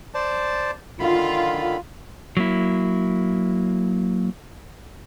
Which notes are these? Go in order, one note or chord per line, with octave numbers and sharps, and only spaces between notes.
C5 D5 A5
D3 D#3 F4 B5
F#3 A#3 E4